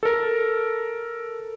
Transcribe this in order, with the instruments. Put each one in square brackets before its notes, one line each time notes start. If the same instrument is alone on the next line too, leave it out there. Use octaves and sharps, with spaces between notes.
[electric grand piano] A4 A#4